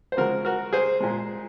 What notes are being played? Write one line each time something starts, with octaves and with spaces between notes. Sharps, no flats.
C5
C#3 F3 G#3 F#4 A#4
F#4 A#4
G#4 C5
A#2 G#3